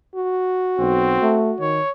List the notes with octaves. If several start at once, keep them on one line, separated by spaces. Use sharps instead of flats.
F#4
B1 C4
A3
D#3 C#5